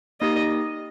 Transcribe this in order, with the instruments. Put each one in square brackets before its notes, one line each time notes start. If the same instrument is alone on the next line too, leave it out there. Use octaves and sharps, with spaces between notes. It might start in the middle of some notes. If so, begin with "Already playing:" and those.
[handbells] A#3 D#4 G4 [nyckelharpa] D#5